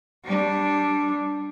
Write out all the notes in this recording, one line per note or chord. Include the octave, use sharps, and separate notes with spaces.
G3 D4